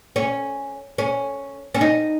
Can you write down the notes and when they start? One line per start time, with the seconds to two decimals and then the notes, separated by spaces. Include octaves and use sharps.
0.16 C#4
0.98 C#4
1.74 C#4
1.81 D#4